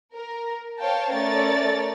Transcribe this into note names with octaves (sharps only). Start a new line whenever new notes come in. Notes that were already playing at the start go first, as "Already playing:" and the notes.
A#4
C5 C#5 F5 G5 A5
A3 C#4 A#4 C#5 D5 A6